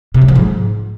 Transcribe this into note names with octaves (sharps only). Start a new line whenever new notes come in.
C3
F#3
F3
G#2